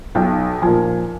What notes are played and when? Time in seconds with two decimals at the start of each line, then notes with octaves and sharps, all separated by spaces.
0.15 B1 G5
0.62 A#2 F3 G#5